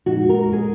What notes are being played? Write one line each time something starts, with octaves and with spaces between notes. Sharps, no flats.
A#2 F3 G#3 D#4 F#4
A#4
G#4